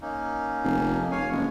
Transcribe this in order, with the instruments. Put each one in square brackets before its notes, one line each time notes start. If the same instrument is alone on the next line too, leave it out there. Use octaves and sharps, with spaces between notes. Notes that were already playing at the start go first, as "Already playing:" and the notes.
[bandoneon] A#3 C#4 D#4
[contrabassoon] F1
[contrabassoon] F1 [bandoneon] C#5 F5 G#5
[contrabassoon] F#1 [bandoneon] G#3 B3